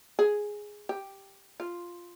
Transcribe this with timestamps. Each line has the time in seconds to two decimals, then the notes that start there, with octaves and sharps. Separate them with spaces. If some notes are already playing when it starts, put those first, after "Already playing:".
0.19 G#4
0.89 G4
1.60 F4